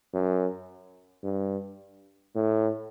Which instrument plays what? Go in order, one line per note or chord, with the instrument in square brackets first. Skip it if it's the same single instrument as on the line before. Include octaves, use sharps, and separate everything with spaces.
[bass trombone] F#2
G2
A2